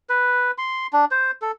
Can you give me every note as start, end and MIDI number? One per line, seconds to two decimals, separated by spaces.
0.09 0.51 71
0.58 0.87 84
0.93 1.05 62
1.11 1.31 72
1.42 1.51 69